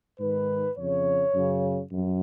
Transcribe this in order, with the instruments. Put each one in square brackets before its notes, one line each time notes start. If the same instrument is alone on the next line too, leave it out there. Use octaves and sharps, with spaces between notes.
[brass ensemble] G#2 D#3 B4
F2 C#3 C#5
F#2 C#3
F#2